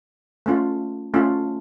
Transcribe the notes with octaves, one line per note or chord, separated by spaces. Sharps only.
A3 C#4 F4
A3 C#4 F4